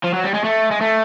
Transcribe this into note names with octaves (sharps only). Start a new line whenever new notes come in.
F3
F#3
G3
G#3
A3
G#3
A3